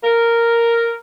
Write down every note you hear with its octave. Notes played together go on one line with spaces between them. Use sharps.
A#4